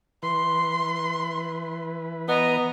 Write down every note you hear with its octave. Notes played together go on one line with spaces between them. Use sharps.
E3 B4 C6
B3 D#5 A#5